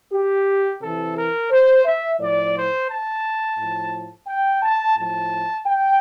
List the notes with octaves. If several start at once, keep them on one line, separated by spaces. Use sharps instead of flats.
G4
C3 E3 A4
A#4
C5
E5
A2 F3 D5
C5
A5
A2 F3
G5
A5
A2 F3 A5
G5